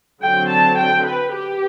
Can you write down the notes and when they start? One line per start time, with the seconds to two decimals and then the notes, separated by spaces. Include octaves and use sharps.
0.22 D3 F#3 C4 G5
0.50 A5
0.79 G5
1.06 B4
1.34 G4